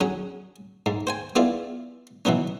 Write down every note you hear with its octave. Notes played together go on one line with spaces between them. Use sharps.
F#3 C#4 G#4
G#2
C5 G5 G#5
B3 E4 F4 G#4 D5
B2 E3 F#3 B3 C#4